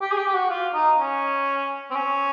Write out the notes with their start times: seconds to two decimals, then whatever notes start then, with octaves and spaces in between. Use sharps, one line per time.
0.01 G4
0.12 G#4
0.18 G4
0.28 G4
0.35 F#4
0.50 F4
0.74 D#4
0.99 C#4
1.91 C4
1.95 C#4